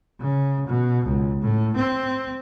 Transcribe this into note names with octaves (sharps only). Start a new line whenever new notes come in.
C#3
B2
C#2
A2
C4